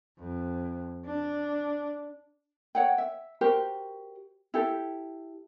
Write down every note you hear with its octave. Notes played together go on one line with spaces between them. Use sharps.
F2
D4
C#5 F#5 G5
E5
F#4 G4 A#4 C5
E4 G4 A4